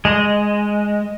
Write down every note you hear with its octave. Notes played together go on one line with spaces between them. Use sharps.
G#3 D#5